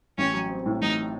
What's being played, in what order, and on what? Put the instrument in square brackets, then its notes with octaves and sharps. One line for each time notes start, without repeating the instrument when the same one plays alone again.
[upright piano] A1 [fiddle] C#4
[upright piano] F#3
C4
A2
[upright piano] A1 [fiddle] D#4